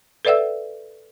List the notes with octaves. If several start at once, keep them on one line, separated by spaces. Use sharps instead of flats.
A4 B4 D5 E5 F#5 E6